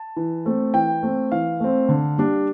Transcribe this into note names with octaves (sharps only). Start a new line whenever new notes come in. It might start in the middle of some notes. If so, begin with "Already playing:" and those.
Already playing: A5
E3
A3 C4
E3 G5
A3 C4
E3 F5
A3 C4
D3
G3 D4